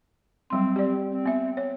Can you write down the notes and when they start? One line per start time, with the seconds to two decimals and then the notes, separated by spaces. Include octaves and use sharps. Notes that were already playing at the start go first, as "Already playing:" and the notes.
0.50 F#3 G3 C4 C6
0.76 G4 D5
1.11 C4
1.26 B3 E5
1.57 C#5